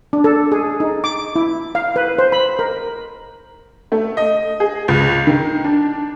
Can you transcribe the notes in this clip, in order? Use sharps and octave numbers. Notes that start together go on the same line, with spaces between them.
D4
A4
G#4
D#4
D6
E4
F5
B4
C5
B5
A#4
A3
D#5
G#4
C#2
D#3
D4